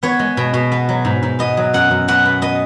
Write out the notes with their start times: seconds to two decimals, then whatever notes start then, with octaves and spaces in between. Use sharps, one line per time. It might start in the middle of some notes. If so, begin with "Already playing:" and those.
0.03 B3 C#5
0.19 G#3
0.37 B2
0.54 B2
0.72 B3
0.89 F#3
1.05 G#2
1.23 G#2
1.39 B3 D#5
1.57 F#3
1.73 F#2 F#5
1.91 F#2
2.08 B2 F#5
2.25 B3
2.42 B3 D#5